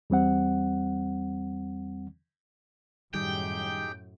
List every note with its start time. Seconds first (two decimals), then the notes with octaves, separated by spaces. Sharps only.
0.10 E2 G3 C4 F#5
3.14 F#2 A2 D#3 G3 D#4 G4 G#4 G5